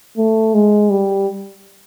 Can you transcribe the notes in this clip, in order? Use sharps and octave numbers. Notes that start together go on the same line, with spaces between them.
A3
G#3
G3